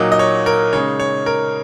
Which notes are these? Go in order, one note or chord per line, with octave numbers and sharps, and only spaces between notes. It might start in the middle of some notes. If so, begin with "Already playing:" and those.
Already playing: A#2 F#3 A#3 D#4
D#5
C#5
A#4
C#3 G#3 D#4 C#5
C#5
A#4